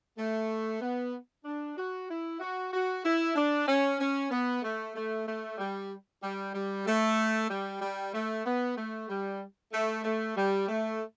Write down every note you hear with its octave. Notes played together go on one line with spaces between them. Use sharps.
A3
B3
D4
F#4
E4
F#4
F#4
E4
D4
C#4
C#4
B3
A3
A3
A3
G3
G3
G3
A3
G3
G3
A3
B3
A3
G3
A3
A3
G3
A3